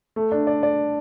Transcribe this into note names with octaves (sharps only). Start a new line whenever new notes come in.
A3
D4
D5
D5